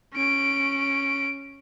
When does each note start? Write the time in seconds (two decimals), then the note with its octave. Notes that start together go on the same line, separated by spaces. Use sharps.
0.14 C#4 D7